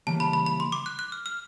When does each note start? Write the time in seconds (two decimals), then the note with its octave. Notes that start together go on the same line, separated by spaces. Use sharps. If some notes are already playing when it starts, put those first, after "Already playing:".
0.07 C#3 E3 G3 A#3 A5
0.20 B5
0.33 B5
0.46 B5
0.60 C6
0.72 D6
0.86 F#6
0.99 F#6
1.12 F6
1.26 F6